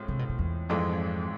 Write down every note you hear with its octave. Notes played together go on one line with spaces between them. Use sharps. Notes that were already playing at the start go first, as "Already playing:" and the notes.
Already playing: A2 G#3 C4 F4
C3
B2
B2
E2
G#1 F2 G#2 E3 G#3 C4